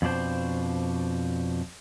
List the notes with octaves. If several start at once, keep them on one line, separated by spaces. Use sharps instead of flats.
F2 B2 D4 C5